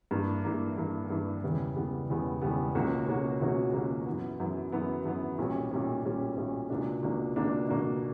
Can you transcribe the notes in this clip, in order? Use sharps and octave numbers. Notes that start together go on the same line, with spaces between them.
G2 E3 A#3
G2 E3 A#3
G2 E3 A#3
G2 E3 A#3
E1 E2 C#3 G3 B3
E1 E2 C#3 G3 B3
E1 E2 C#3 G3 B3
E1 E2 C#3 G3 B3
C#2 B2 A#3 C#4 F#4
C#2 B2 A#3 C#4 F#4
C#2 B2 A#3 C#4 F#4
C#2 B2 A#3 C#4 F#4
F#2 E3 B3
F#2 E3 B3
F#2 E3 B3
F#2 E3 B3
B1 A#2 G3 C#4
B1 A#2 G3 C#4
B1 A#2 G3 C#4
B1 A#2 G3 C#4
C#2 B2 A#3 D4
C#2 B2 A#3 D4
C#2 B2 A#3 D4
C#2 B2 A#3 D4